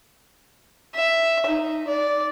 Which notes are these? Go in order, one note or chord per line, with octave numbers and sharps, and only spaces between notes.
E5
D#4
D5